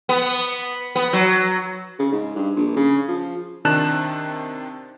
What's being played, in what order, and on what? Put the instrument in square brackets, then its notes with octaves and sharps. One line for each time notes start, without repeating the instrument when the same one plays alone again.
[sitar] B3
B3
F#3
[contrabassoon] C#3
G#2
G2
A#1
C#3
F3
[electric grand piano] C3 D#3 D4 A5 F#6 E7